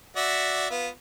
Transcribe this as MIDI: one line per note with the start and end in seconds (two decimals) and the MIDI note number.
0.16 0.69 66
0.16 0.69 74
0.16 0.69 76
0.70 0.88 59
0.70 0.88 65